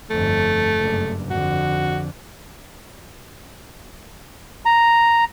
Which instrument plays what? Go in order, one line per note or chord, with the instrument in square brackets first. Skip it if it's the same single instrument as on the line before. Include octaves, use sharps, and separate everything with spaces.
[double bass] G1 F2 [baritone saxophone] A3
[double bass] F#1 G2
[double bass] F2 D3 [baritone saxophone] F#4
[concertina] A#5